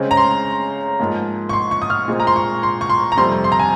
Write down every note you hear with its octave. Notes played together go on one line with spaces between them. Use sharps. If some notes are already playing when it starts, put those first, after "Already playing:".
Already playing: C#3 G#3 C4
A#5
C6
G#2 F3 A#3
C#6
C6
C#6
D#6
F6
A#2 G#3 C4
A#5
C6
C#6
C6
C#6
C6
A#5
F2 C3 G3 C4 C6
C6
A#5
G#5